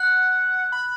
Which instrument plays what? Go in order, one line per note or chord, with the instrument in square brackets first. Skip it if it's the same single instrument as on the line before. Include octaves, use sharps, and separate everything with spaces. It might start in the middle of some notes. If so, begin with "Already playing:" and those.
Already playing: [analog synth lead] F#5 [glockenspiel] F#6
[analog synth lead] B5